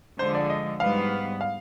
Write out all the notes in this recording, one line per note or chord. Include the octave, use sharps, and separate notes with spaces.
D3 F3 G#3 C5
D5
D#5
G#2 G3 B3 F5
F5